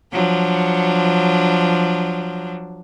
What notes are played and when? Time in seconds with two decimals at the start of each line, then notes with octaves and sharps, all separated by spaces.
0.13 F3 F#3 D4